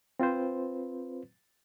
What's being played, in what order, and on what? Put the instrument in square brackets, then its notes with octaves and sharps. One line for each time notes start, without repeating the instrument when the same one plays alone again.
[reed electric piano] C4 F4 B4 C5